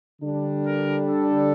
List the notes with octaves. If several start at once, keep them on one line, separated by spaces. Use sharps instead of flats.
D3 G3 D4
A#4
A4